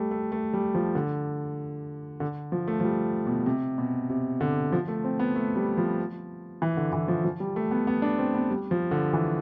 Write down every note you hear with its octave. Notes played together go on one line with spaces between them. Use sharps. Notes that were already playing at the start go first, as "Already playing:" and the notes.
Already playing: G3 A3
A3
A3
G3
F3
D3
D3
F3
A3
F3
G3
B2
C3
B2
C3
D3
F3
A3
C4
B3
A3
G3
F3
E3
D3
E3
F3
F3
G3
A3
B3
B3
D4
C4
B3
G3
F3
D3
E3